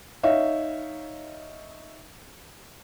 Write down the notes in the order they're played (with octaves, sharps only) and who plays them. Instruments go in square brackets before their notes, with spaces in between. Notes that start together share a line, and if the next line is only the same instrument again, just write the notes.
[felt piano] D#4 C#5 E5 F5